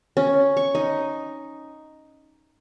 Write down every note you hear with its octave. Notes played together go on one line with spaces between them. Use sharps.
C#4
C#6
D#4